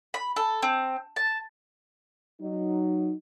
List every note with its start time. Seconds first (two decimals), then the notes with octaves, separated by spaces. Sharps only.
0.14 B5
0.36 A4
0.62 C4
1.16 A5
2.41 F#3 D#4